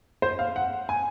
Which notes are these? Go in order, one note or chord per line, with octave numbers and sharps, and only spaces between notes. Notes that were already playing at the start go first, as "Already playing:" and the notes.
C5
F5
F#5
G#5